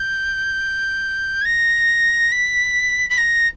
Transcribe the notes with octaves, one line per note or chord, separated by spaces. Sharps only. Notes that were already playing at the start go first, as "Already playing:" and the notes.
Already playing: G6
G#6
A#6
B6
B6
A#6